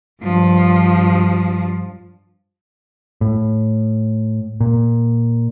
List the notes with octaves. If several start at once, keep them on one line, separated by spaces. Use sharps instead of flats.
G2 F3
A2
A#2